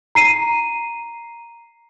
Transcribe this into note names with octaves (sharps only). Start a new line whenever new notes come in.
A#5 C7 D#7